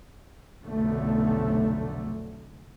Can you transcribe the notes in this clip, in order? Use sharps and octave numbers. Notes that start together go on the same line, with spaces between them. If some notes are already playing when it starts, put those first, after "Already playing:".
F1 B1 D3 A3